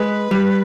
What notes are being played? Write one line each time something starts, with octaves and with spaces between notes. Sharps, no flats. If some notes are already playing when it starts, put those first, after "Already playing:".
Already playing: G#3 B4
G3